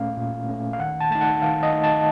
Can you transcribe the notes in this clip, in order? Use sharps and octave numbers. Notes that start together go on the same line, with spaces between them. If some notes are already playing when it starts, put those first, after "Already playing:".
Already playing: A#2 A3 C#4 F5
A#2
A3 C#4
F5
D#3 F#5
A5
A3 D#4 A5
F#5
D#3 F5
D#5
A3 D#4
A5